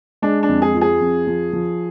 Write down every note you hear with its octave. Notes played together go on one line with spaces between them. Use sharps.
G#3 D4
D4
F2
G#4
F3
G#4
F2
F3
F3